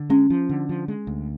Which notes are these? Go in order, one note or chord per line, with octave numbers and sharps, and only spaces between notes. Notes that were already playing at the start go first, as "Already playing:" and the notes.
Already playing: D3
G#3 C#4
F3
D3
F3
G#3
D2